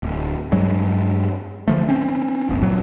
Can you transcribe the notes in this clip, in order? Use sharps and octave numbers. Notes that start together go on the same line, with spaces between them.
D1
G2 F#3 G#3
D3 F3 A3
C4 C#4
D1 G1
F#2 A#2 F#3